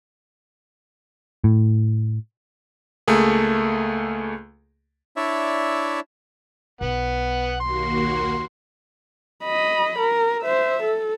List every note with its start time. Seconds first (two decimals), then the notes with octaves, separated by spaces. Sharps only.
1.44 A2
3.08 C#2 A3 A#3 G#4
5.16 D4 E4 C#5 D5 E5
6.81 B1 B3 F#5
7.60 D#2 A#3 F#4 C6
9.44 D#5 B5
9.99 A#4
10.42 C5 E5
10.83 A4